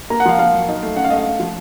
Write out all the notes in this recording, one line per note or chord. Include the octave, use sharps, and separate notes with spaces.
A#3 A#5
F#5
F3 F5
A#3 F5
F#3
D#4
A3
C#4 F#5
F5
A3 D#5
F5
A3
F3